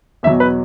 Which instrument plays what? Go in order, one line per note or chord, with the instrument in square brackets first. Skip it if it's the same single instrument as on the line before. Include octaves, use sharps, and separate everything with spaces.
[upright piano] E2 B2 F#3 E5
B4